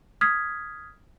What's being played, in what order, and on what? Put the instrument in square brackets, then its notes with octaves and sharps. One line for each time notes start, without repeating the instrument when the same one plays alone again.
[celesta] D#6 F6 G#6 B6